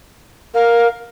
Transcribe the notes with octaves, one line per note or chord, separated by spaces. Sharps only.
A#4 F5